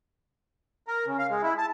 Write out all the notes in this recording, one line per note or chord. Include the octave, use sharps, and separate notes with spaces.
A#4
C#3
F5
G#3
E4
A5